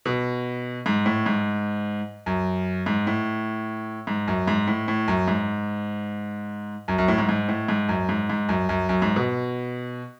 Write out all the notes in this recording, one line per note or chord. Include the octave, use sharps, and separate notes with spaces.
B2
G#2
A2
G#2
F#2
G#2
A2
G#2
F#2
G#2
A2
A2
F#2
G#2
F#2
F#2
A2
G#2
G#2
A2
G#2
F#2
G#2
G#2
F#2
F#2
F#2
G#2
B2